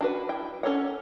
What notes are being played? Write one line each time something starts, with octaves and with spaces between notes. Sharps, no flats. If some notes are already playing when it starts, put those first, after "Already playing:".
D4 F#4 B4
E4 G5
C#4 F#4 A4 C#5 F#5